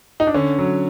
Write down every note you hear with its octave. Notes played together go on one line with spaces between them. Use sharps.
D#4
D4
D3 C#4
F#3